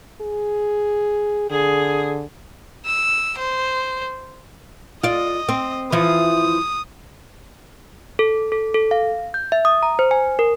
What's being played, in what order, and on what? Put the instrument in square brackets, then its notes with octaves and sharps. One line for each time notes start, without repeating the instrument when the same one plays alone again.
[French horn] G#4
[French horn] D3 [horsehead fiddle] G#4
[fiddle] E6
C5
[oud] F4 D5 [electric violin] D#5
[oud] C4
[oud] E3 F3 [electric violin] D#6
[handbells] A4
A4
A4
F5
G6
E5
D#6
A#5
C5
G#5
A#4